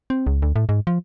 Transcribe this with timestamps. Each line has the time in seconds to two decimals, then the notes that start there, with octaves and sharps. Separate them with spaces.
0.10 C4
0.27 C#2
0.42 D2
0.56 A2
0.69 G#2
0.87 F3